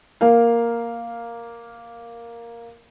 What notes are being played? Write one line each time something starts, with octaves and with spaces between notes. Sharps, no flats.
A#3 A#4 F5